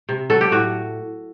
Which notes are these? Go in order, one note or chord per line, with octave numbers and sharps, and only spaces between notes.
C3
F#3 A4
G4
A2 F#4